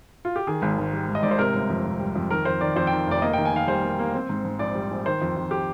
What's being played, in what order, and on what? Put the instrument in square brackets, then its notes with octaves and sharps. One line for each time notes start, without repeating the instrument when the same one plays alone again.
[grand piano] F4
G4
D#3 G#4
G#1
G#2
G3
G#2
D#5
G#2 D5
C5
C3 A#4
G1
F2
C3
G3
F2
D#3 A#4
F2 C5
D#3 D5
F2 C5
G5
D#3
F1 D5
D5
A#3 D#5
G5
D#3
G#5
D#3 F5
G3 C5
A#3
A#3
C4
G#2
G#2
A#1 D5
G3
A#1
D#3 C5
F2
F2
G4